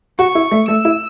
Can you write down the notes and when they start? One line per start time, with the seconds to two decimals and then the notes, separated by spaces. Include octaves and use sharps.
0.19 F#4 C#6
0.35 E4
0.51 A3
0.68 A3 E6
0.85 E4